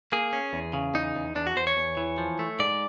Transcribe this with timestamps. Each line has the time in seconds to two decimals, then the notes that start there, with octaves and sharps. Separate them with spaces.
0.12 A#3 G#4
0.33 C#4
0.53 E2
0.73 C#3
0.94 E2 D#4
1.15 E2
1.35 E2 D4
1.47 F#4
1.56 E2 C5
1.67 C#5
1.77 E2
1.97 E3
2.18 F3
2.39 A3
2.59 G#2 D5